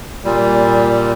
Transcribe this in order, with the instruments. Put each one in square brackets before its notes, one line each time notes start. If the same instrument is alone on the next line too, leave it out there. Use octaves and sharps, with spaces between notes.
[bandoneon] A#2 G3